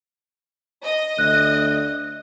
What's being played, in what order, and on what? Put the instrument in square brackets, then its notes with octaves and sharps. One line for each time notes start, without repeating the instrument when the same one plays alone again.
[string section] D#5
[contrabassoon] D2 [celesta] F#6